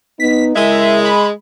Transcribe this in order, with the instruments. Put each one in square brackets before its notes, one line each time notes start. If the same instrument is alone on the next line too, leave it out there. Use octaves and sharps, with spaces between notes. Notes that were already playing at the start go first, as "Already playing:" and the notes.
[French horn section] B3 D#4 [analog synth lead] B6
[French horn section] C#3 E4 A#4 [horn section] G#3 [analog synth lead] E5
[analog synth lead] B5